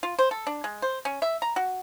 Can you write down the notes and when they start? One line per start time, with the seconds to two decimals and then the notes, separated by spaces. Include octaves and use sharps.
0.03 F4
0.19 C5
0.31 A4
0.47 D4
0.64 G#3
0.82 C5
1.05 C#4
1.22 E5
1.42 A#5
1.56 F#4